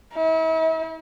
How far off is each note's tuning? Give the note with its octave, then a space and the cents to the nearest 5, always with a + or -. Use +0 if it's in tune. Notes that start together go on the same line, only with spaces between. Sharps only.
E4 -40